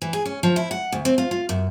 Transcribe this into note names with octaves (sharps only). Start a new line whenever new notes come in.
E3
G#4
C#4
F3
E4
F#5
D2
C4
F4
F4
F#2